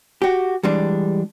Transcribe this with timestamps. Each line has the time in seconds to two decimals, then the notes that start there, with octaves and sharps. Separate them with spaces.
0.22 F#4 G4
0.63 E3 G3 G#3 D4